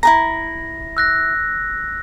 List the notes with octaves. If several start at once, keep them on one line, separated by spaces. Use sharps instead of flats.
E4 G#4 A#5 A#6
E6 F#6 A#6